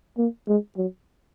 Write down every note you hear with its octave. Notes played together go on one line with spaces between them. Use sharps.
A#3
G#3
F#3